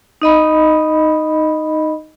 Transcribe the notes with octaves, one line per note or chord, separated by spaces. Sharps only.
D#4 D#5 B5